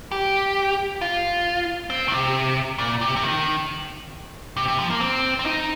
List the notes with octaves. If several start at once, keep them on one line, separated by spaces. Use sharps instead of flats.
G4
F4
C4
D#3
C3
A#2
C3
C3
D#3
C3
C3
F3
A#3
C4
C4
D#4